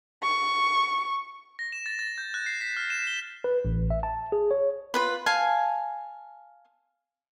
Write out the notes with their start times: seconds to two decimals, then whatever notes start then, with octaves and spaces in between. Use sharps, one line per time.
0.23 C#6
1.59 A#6
1.72 E7
1.86 A6
1.99 A6
2.18 G6
2.34 F#6
2.46 C7
2.61 B6
2.77 F6
2.90 E7
3.07 G7
3.44 B4
3.65 A1
3.90 E5
4.03 A5
4.32 G#4
4.51 C#5
4.94 F4 B4 B5
5.26 F5 G#5 A5